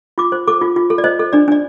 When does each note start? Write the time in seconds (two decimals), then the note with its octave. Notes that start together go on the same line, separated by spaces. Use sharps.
0.18 F4 D6
0.32 C5
0.48 A4 D6
0.61 F4
0.76 F4
0.90 A4
0.98 D5
1.04 C5 D#5
1.19 A4
1.33 D4 D5
1.48 D4 D5